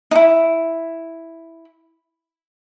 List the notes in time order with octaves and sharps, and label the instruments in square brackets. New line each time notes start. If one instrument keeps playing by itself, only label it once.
[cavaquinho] D#4 E4